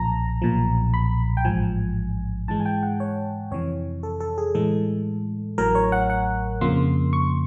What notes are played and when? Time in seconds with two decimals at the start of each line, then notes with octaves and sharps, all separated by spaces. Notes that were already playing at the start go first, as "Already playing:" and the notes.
Already playing: B1 A#2 F3 A5 A#5
0.42 B1 A#2 F3
0.94 B5
1.37 G5
1.45 A1 G#2 F3 G#5
2.48 G#2 E3 G#3 A5
2.60 G#5
2.66 G5
2.83 F#5
3.00 C#5
3.51 F2 C3 E3 C#5
4.03 A4
4.20 A4
4.38 G#4
4.55 A2 E3 G#3 A4
5.58 A1 A2 F#3 A#4
5.75 C#5
5.92 F#5
6.10 F#5
6.61 F2 C#3 F3 A#3 C6
7.13 C#6